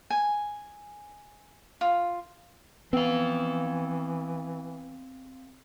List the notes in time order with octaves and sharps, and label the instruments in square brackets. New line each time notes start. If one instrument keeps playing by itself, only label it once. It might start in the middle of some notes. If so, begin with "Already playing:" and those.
[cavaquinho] G#5
F4
[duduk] E3 [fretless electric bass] B3 [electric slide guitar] C4 F5